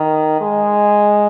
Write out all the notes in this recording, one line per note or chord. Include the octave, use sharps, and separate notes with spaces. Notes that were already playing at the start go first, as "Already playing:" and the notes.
Already playing: D#3
G#3